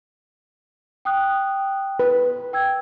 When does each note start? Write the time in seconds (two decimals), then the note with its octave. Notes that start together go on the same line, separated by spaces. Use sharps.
1.05 G5 D#6 F#6
2.00 B4
2.53 G5 E6 G#6